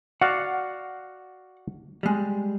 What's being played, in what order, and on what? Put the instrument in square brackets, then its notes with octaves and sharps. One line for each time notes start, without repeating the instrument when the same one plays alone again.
[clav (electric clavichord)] F#4 D5 F5 [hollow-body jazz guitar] F#5
[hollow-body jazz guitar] G3 G#3